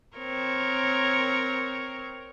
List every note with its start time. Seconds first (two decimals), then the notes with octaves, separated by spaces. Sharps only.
0.17 C4 A#4 C#5